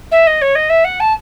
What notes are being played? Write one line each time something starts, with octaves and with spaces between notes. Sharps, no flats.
E5
D#5
C#5
D#5
E5
F#5
A5